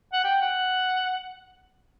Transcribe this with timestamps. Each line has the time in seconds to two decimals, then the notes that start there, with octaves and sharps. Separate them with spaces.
0.13 F#5
0.24 G5
0.41 F#5